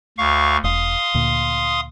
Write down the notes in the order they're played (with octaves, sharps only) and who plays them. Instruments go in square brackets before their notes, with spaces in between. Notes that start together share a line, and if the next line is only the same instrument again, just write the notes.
[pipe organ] D2 F5 C#6
[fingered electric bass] E1 [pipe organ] F5 C6 D#6
[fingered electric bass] D2 A#2